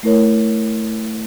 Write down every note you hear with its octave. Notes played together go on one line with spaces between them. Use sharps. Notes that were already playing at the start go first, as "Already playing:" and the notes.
A3 E4 A#4 C#5